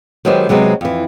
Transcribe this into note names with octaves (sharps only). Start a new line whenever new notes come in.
D#3 F#3 G#3 B3 G4 C5
C3 F#3 G#3 B3 C4
F2 E3